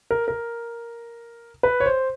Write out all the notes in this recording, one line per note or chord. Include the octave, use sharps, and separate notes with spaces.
A#4
A#4
B4
C#5
C5